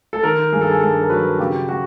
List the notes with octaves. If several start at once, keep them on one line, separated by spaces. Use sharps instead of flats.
A4
D#3 A#4
G2 G#4
A4
G#4
G2 A4
A#4
F#3 B4
C#3 G4
F#4